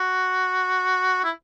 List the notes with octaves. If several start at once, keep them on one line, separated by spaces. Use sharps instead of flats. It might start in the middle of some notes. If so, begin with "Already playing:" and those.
Already playing: F#4
E4